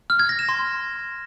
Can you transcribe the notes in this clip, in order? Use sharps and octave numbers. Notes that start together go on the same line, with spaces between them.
F6
G#6
A#6
E7
C6